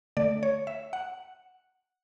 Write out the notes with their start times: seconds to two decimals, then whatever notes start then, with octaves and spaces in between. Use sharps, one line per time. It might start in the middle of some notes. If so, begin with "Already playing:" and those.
0.17 D3 A3 D5
0.43 C#5
0.67 E5
0.93 F#5